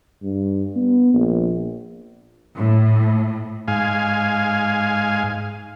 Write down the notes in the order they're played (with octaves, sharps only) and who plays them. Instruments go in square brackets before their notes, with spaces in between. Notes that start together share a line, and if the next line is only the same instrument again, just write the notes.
[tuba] G2
B3
A#1
[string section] A2
[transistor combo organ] G#2 F5 G#5